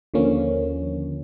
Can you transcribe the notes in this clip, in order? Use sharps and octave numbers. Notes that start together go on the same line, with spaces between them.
D#2 D3 F3 A#3 C#4